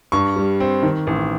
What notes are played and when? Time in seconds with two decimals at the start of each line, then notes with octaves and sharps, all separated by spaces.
0.12 G2 C#6
0.36 G3
0.60 C4
0.83 D#3
1.07 A1